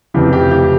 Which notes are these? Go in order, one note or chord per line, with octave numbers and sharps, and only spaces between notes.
F1 F2 C#3 E3 G4
G4
G4